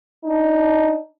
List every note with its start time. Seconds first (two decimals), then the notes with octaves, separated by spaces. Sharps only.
0.24 D4 D#4